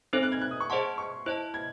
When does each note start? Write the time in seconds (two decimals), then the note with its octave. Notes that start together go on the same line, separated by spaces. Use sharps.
0.13 C4 D#4 A4 C5 F#6
0.23 F#6
0.32 G#6
0.42 F#6
0.51 D#6
0.60 C#6
0.70 G#4 C5 D#5 F#5 A5 C6
0.98 C#6
1.26 E4 C5 D#5 A5 F#6
1.54 G#6